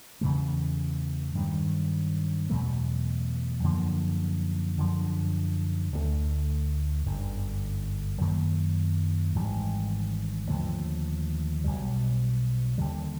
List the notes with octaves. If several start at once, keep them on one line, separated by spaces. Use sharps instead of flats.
E2 C#3 E3 A3
G2 D#3 F#3
E2 B2 F#3 A3
F#2 D3 F3 A#3
F#2 D3 F3
D2 D3 F3 A3
G1 F#2 D3
F#2 D#3 F#3 A#3
G#1 G#2 E3 G3
D#2 D3 F3 A3
B1 B2 G3
D#2 D3 G3